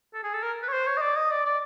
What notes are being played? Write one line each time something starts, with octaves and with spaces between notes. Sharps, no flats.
A4
G#4
A4
A#4
B4
C#5
C5
C#5
D#5
D5
D#5
D5
D5